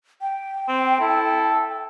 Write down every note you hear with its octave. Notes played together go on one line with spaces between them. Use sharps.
G5
C4
E4 A4